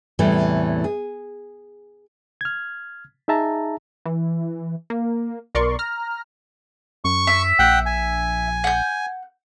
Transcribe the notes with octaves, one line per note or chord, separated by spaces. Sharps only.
E2 A2 C3 E3 G3 A3
G#4
F6 G#6
D#4 G#4 E5 A5 A#5
E3
A#3
B1 A#4 D5 C6 C#6
A#5 F6
F#2 C#6
E5
A#1 F#5 G5
G#5
F#5 G6